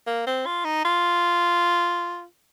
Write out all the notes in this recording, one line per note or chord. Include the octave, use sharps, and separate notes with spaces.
A#3
C4
F4
D#4
F4